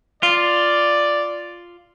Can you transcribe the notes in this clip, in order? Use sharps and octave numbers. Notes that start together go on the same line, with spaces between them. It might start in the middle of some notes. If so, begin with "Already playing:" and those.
F4 D5